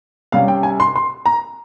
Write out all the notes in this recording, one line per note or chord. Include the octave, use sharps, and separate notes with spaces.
C3 G3 C#4 F5
G5
G#5
C6
C6
A#5